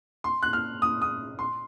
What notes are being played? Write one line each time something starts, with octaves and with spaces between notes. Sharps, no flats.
C6
F#6
F6
D#6
D#6
C6